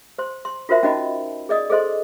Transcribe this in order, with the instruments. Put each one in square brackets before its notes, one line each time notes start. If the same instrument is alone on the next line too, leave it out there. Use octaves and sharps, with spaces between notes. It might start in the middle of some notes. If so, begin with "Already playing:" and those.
[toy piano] C5 C6
C6
F4 F#4 A#4 C5 E5
C#4 D#4 F#4 D#5 A5 B5
G#4 D5 D#5 D#6
G#4 A4 C5 D#5 C6